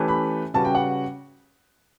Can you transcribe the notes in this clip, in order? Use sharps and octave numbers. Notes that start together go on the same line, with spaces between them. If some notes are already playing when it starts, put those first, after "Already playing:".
Already playing: E3 A3 C#4 G4 B4
B5
C#3 G3 C#4 F#4 B4 A5
G5
F#5